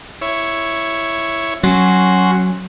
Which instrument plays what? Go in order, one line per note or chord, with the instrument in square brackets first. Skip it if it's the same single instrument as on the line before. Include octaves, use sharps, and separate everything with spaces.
[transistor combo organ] E4 C#5
[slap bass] F#3 [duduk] C#4 [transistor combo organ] F#4 C6